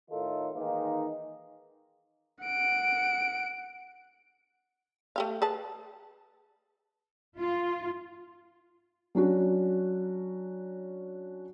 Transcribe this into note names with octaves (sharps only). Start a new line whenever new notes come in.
A2 D#3 D#4 F4 A4
D#3 E3 G#3 A#3 D#4
F#5 D7
A3 G4 F5
G#4 B4 A5
F4
F#3 C#4 D4 F#4